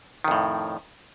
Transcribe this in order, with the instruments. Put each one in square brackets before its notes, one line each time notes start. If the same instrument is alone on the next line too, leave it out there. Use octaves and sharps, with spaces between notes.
[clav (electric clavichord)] D#3
F2
A2